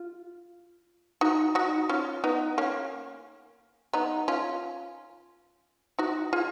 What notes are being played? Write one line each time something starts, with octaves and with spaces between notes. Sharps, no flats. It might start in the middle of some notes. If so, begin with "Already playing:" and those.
Already playing: F4
D#4 F#4
D#4 F#4
C#4 F4
B3 D#4
A#3 C#4
B3 D#4
C#4 F4
D#4 F#4
F4 G#4